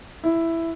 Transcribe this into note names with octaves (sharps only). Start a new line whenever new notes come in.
E4